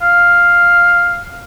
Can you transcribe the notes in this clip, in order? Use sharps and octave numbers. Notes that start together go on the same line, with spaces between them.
F5